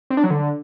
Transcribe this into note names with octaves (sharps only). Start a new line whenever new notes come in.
C4
D4
F#3
D3